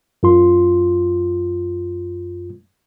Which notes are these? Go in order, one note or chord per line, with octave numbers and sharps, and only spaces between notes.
F#2 F4 C6